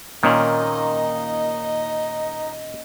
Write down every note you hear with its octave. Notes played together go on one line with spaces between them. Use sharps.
A#2 D#3 A#3 C#4 D#4 D#5